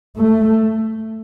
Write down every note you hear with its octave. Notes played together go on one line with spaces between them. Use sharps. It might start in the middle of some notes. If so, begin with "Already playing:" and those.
A3